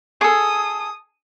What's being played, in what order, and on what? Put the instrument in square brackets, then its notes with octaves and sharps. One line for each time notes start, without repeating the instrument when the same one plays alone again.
[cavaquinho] G#4 A4 [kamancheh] D#6